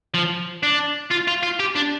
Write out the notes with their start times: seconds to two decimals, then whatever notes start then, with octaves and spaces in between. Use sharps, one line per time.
0.14 F3
0.63 D4
1.11 F4
1.28 F4
1.43 F4
1.60 G4
1.76 D4